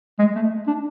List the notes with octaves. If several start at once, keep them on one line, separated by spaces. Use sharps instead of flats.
G#3
A3
D4